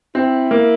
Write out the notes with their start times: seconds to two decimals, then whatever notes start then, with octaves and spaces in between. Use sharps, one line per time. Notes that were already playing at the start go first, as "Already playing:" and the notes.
0.15 C4 E4
0.51 A#3